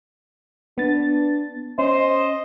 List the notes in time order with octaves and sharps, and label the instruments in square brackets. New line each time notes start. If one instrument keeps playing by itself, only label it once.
[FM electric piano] B3 A6 [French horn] D4
[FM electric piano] C#4 [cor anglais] C5 [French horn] D#5